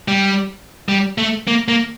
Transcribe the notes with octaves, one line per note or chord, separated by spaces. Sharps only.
G3
G3
A3
A#3
A#3